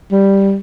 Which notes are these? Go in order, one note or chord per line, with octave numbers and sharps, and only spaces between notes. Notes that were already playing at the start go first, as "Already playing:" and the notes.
G3